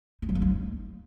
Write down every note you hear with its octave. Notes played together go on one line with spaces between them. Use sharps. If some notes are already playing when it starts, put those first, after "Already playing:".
D#4
F#3
A#3
D#4